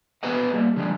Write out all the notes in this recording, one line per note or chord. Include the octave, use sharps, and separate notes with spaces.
B3 G#4 B4 D#5 F#5
G3 A#3
D3 F3 G3 G#3